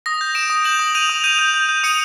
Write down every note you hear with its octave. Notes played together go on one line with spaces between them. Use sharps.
D#6 A#6
G6
D#6 D7 E7
D#6
G6 E7 F#7
D#6
G6 D#7 F7
D#6
G6 D#7 F7
G6
G6
G6
D#6 C#7 D#7